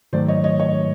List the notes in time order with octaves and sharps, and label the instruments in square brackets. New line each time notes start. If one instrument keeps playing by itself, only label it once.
[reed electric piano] G#2 D#3 F#3 A3 [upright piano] C5 D5
[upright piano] C#5 D#5
C#5 D#5
C#5 D#5